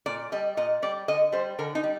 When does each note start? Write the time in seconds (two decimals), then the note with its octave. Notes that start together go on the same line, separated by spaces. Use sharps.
0.06 A#2 D5
0.32 G3 D#5
0.57 A#2 D#5
0.82 G3 D5
1.08 D3 D#5
1.32 G3 C5
1.59 D3 A#4
1.75 D#4
1.84 G3